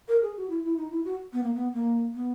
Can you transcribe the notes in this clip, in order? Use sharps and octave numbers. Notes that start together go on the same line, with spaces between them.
A#4
G#4
F#4
E4
E4
D#4
E4
F#4
B3
A#3
B3
A#3
B3